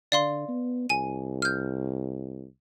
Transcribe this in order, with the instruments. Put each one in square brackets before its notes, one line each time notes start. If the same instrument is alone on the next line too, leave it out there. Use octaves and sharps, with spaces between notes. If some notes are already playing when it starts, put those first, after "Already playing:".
[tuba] D3 [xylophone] D5 F5 C6
[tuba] B3
[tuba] C2 [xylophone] G#5 D#7
[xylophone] F6 G6